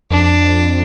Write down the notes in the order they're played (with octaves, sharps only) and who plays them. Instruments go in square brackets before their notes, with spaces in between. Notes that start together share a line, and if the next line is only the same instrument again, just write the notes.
[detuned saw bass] F2 [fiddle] D4